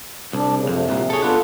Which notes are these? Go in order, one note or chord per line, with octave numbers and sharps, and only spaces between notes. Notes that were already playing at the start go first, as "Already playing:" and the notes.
C2 D4
C#3
F2 C3
C2 A#2
D2 G#4 A4 C#5
B3 D4 F4 A4